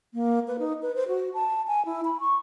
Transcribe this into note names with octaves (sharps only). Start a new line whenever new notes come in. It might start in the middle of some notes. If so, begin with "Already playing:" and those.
A#3
B4
D#4
B4
C5
F#4
A5
G#5
E4
B5
C#6